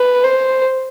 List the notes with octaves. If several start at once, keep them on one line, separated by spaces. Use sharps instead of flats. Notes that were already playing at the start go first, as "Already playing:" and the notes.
Already playing: B4
C5